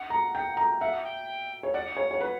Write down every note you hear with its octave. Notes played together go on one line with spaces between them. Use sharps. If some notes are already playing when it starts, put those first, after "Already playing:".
Already playing: F#5
A#5
G5
A#5
E5 F#5
G5
C#5
D5 F#5
C#5
C#5
B4